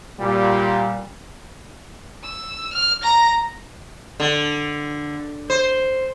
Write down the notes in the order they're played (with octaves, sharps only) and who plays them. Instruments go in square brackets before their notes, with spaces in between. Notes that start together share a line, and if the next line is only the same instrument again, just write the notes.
[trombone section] A#2 G3
[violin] E6
F6
A#5 A#6
[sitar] D3
C5